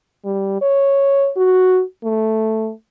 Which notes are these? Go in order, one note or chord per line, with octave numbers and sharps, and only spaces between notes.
G3
C#5
F#4
A3